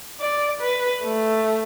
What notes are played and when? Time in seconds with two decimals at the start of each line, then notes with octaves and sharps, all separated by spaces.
0.20 D5
0.61 B4
1.03 A3